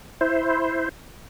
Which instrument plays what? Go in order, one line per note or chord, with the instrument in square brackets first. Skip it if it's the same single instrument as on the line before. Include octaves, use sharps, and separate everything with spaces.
[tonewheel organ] E4 C5